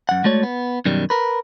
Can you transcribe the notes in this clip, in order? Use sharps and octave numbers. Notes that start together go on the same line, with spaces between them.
F#2 F#5
G#3 A3 F#4 C#5 D5
B3
F#2 B2 D#3 G3
A#4 B4